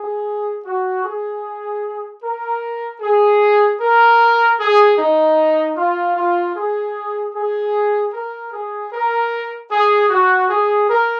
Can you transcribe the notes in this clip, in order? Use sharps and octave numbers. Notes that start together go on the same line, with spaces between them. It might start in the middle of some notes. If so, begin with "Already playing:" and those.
Already playing: G#4
F#4
G#4
A#4
G#4
A#4
G#4
D#4
F4
F4
G#4
G#4
A#4
G#4
A#4
G#4
F#4
G#4
A#4